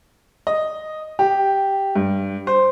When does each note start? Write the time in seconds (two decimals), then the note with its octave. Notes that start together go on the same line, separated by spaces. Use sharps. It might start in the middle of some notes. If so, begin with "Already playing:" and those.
0.47 D#5
1.19 G4
1.96 G2
2.47 C5